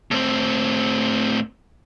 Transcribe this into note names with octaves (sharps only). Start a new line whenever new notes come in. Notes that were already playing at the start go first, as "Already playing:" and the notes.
A2 C4